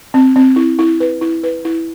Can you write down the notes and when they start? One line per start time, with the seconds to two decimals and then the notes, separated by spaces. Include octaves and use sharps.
0.14 C4
0.36 C4
0.56 E4
0.79 E4
1.00 B4
1.21 E4
1.43 B4
1.65 E4